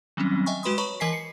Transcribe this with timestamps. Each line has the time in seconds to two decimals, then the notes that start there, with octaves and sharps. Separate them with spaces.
0.17 D#3 F#3 G3 C4 C#4
0.46 D#5 E5 G5 G#5 C#6
0.63 G#3 F#4 B4 B5 C6 D#6
0.78 B4 C#5 A#5 B5 C#6
1.00 E3 A#4 D#5 G#5 B6 C7
1.13 C7 C#7